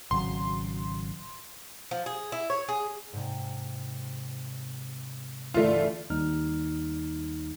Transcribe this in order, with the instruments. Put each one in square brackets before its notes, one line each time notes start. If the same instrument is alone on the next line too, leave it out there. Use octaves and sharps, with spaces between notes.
[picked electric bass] G#1 C#3 F#3 [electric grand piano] C6
[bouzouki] F3
G#4
E4
C#5
G#4
[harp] G#2 C3
[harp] G1 D3 E3 [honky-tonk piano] A3 F4
[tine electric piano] D#2 G3 D#4 F6